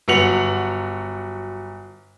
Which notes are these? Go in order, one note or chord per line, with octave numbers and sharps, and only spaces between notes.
G1 F#3 F#4 C#7 F7 F#7